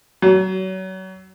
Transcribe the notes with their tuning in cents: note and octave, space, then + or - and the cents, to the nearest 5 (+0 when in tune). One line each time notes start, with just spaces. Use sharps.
F#3 +30